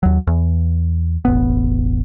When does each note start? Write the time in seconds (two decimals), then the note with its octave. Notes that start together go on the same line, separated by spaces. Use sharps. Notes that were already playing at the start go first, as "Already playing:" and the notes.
0.03 D#2 F#3
0.27 E2
1.25 E1 A1 B3